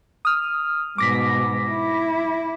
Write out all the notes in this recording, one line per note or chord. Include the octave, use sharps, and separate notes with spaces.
D#6 F6
G#2 B2 D6 A#6 B6
E4